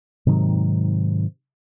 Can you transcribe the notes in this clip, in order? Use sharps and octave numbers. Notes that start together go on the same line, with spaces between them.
G#2 C3 D#3 F#3